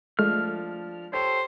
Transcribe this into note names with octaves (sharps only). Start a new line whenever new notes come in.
F3 G#3 A3 D4 F6
G4 A4 C5 C#5